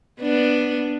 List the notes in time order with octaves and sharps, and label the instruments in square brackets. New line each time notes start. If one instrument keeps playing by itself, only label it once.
[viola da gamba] B3 D4